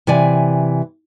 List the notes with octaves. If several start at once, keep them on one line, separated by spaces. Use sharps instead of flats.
C3 E3 D5 G#5